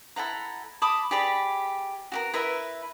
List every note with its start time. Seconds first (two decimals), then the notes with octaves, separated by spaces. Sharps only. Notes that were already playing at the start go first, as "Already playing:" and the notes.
0.16 E4 A4 F#5 A#5
0.82 A5 B5 D6 D#6
1.11 G4 G#4 D5 B5
2.12 F#4 G4 A#4
2.34 E4 A#4 B4 E5